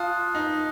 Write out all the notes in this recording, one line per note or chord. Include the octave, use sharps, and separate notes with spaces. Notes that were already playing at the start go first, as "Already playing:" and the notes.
Already playing: F4 A5 D#6 F#6
D#4